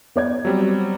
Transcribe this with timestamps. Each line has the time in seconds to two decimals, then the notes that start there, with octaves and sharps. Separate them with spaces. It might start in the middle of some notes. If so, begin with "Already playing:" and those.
0.16 B3 D5 G#6
0.45 F#3 G3 C4